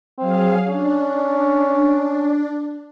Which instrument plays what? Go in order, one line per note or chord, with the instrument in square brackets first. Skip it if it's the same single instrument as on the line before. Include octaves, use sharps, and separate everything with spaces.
[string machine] F#3 G#4 F5 [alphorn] C4
[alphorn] C#4 [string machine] D4